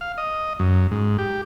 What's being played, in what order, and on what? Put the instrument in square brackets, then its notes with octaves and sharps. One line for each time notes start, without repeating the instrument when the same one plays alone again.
[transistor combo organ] F5
D#5
F#2
G#2
G4